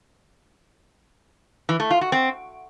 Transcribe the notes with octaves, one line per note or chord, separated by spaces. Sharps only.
E3
A3
F4
F#4
C4